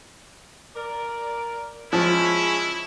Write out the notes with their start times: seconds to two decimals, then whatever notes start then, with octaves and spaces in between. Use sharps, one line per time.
0.75 A#4 D5
1.93 F3 G#3 C#4 E4